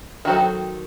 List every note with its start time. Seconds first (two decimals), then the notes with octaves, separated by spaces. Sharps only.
0.25 D#3 F#3 F#4 A4 C5